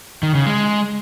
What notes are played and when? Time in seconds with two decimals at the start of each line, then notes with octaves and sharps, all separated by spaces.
0.23 D#3
0.35 C#3
0.46 G#3